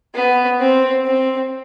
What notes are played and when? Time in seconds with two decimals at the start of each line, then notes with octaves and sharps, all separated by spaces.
0.14 B3
0.60 C4
1.05 C4